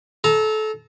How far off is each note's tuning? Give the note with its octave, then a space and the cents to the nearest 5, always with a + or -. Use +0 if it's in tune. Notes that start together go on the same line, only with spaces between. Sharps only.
A4 -25 A#5 +0